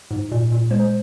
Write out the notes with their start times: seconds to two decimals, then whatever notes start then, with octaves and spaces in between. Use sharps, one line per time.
0.11 G#2
0.31 A#2
0.52 A#2
0.71 G#3 C5